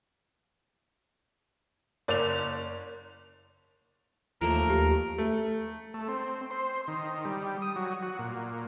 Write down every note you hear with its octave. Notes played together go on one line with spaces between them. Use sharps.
F#1 A#4 C#5 D5 F7
D#2 F3 A3 A#3 A#4
D#2 G4
A3
A3
C4
C5
D#3
G3
D#6
F#3
F#4
A#2